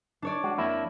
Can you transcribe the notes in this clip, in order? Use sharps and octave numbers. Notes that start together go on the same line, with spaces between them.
D4 C#5 D5
G#3 F#4
F2 A#3 E4